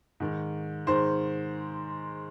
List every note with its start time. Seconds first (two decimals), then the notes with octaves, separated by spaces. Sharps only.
0.20 G#2 D#3
0.87 G#2 D#3 C5